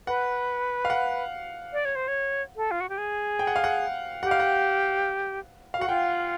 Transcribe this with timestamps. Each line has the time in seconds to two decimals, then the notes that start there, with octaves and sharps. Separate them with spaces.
0.07 B4 F#5
0.85 F5
0.90 F#5
1.73 D5
1.85 C#5
1.95 C5
2.08 C#5
2.56 A4
2.71 F4
2.80 F#4
2.89 G4
2.98 G#4
3.39 G5
3.47 F#5
3.56 F5
3.64 F#5
4.23 G4 F#5
4.31 F5
4.40 F#5
5.74 F5
5.78 F#4 F#5
5.89 F4 G5